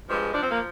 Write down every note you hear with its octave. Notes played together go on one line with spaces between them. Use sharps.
G2 F3 G#3
F3 D4
C4
A#3